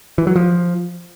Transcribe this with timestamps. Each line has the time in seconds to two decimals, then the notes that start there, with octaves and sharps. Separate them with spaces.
0.18 E3
0.27 F#3
0.36 F3